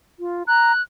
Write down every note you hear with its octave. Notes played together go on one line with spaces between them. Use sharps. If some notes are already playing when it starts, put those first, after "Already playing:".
F4
A#5 F#6